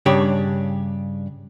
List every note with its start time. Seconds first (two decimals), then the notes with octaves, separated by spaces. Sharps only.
0.06 G2 C#3 D4 G4 C#5